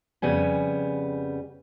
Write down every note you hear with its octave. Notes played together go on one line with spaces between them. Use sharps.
F2 C#3 G3 B3 G#5